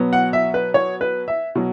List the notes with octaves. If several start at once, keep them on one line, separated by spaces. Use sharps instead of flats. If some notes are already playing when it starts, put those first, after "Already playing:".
Already playing: B2 F#3 B3
F#5
E5
B4
C#5
B4
E5
B2 F#3